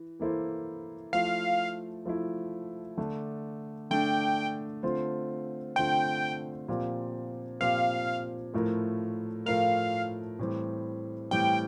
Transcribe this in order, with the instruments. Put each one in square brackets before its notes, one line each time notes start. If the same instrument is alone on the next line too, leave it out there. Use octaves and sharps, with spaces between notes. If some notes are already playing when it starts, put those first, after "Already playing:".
Already playing: [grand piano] E3
E3 A#3 E4 A4 C5
[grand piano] F3 A3 E4 [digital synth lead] F5
[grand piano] F3 A3 E4
D3 A3 D4
[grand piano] D3 A3 D4 [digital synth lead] G5
[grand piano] D3 A3 C4 F4 C5
[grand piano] D3 A3 C4 F4 C5 [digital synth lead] G5
[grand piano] A#2 F3 C4 G4
[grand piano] A#2 F3 C4 G4 [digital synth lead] F5
[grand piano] A2 F3 A3 E4 A#4
[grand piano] A2 F3 A3 E4 A#4 [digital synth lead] F5
[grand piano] A2 E3 G3 C4 G4
[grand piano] A2 E3 G3 C4 G4 [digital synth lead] G5